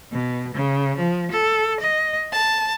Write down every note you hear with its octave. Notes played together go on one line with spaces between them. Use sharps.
B2
C#3
F3
A4
D#5
A5